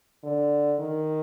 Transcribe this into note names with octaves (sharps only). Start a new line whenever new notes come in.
D3
D#3